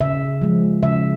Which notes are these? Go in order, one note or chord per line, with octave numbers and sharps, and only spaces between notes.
C#3 E5
F3 G#3
C#3 E5